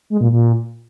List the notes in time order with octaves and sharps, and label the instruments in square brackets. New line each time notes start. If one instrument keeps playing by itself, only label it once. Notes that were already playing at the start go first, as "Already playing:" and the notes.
[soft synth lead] G#3
A#2
A#2